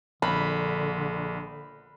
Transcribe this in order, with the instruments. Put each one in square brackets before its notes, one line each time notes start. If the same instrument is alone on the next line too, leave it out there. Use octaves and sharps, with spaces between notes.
[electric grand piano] A#1 [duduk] D3 [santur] B5